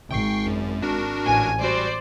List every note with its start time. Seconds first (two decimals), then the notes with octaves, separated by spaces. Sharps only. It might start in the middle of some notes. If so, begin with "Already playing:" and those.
0.11 G#1 G5 C#6 C7
0.47 F#2
0.82 D4 F#4 A#4
1.25 A1 G#5
1.61 G3 F#4 C5 D5